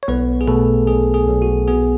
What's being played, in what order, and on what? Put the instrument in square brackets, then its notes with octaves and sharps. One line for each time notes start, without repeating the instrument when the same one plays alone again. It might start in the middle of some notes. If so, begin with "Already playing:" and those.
[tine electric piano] C#5
B1 B3 B4
G#4
B2 A3 A4
B1 G#4
G#4
B1
F#4
B3 G#4